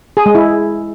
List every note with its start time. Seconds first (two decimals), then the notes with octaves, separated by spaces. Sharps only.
0.17 G#4
0.26 G#3
0.35 E4